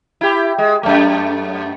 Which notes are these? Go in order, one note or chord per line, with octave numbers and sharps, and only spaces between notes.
E4 G4
G#3
F#2 A3